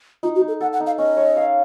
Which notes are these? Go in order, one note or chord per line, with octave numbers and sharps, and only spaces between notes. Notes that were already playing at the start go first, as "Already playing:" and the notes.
D#4 F4
F#4
D#4
A4
A4 F#5
F#5
D#4
F5
C#4 D#5
C#5
F5